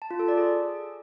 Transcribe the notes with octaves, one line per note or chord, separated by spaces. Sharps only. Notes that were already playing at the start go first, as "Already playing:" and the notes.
A5
F4
A4
D5
G#4